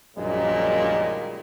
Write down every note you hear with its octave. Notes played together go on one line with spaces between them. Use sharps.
A#1 F#2 A#2 D#3 G3 G#3